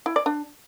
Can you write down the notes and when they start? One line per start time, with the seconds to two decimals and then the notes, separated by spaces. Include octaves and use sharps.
0.06 E4
0.16 D5
0.26 D4